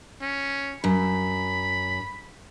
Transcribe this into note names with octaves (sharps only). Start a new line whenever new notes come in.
C#4
F#2 B5